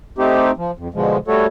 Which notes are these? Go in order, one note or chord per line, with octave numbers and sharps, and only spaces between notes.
A3 C4 D#4 G4
F3
F2
B2 D3 F3 G#3
G3 A3 F#4 A4 C#5